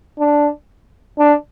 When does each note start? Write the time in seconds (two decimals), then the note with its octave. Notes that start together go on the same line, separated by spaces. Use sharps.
0.19 D4
1.18 D4